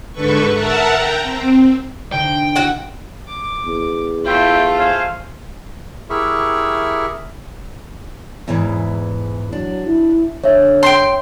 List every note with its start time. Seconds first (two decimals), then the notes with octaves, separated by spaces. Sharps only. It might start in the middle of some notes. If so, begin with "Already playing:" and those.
0.12 G#2 D3 A4 B4 C#6
0.53 A#4 E5 F#5 A5 A#5
0.92 G5 A#5
1.23 C4
2.12 D3 D#4 C5 G5
2.56 E4 F#4 G4 F#5
3.28 D6
3.65 E2
4.24 A3 E4 F4 E5 G5
4.77 C5 F5 G#5
6.10 E4 G4 G#4 A#4 E5 C#6
8.48 E2 G#2 E3
9.52 F#3 D4
9.85 E4
10.44 D3 D4 C#5 E5
10.83 G5 C6